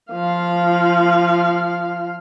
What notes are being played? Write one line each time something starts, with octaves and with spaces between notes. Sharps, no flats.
F3 F5